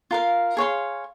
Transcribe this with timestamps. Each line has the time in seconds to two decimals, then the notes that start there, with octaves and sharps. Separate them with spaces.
0.11 F4 A#4 F5
0.57 G#4 C#5 F5 C6